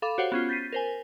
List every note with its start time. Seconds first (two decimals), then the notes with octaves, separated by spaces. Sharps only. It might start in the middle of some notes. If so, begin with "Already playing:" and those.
0.02 A4 F5 B5 D6
0.18 F#4 G4 C5 C#5 F5 F#5
0.32 B3 C#4 F4
0.49 G6 A6 B6 C7 D#7
0.73 A#4 C5 G#5